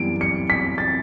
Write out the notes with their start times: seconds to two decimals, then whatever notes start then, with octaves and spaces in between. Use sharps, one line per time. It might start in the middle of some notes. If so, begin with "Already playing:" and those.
Already playing: F#2 E3 G3 B3 D7
0.21 C#7
0.50 B6
0.78 A6